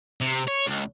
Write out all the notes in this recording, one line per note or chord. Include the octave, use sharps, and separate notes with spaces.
C3
C#5
C#2